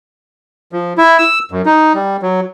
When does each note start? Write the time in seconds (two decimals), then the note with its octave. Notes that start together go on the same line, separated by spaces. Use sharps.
0.72 F3
0.98 E4
1.18 E6
1.51 F#2
1.66 D#4
1.94 G3
2.22 F#3